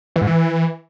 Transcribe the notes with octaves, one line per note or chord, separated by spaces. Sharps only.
E3
G#2
E3